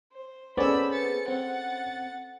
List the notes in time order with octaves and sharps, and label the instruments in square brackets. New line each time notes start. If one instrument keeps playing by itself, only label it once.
[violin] C5
[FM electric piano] B3 G#4 [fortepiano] C#4 D5 [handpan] A4 C5 [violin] B5 E6
[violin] A6 C#7
[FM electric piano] C4 [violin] F#5 A6